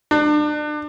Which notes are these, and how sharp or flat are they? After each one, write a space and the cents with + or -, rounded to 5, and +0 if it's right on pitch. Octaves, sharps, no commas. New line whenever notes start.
D4 +35